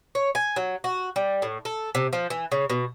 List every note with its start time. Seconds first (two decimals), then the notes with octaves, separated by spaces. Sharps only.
0.15 C#5
0.35 G#5
0.56 F#3
0.84 F#4
1.16 G3
1.42 A2
1.65 A4
1.95 C3
2.13 F3
2.30 E3
2.52 C#3
2.70 B2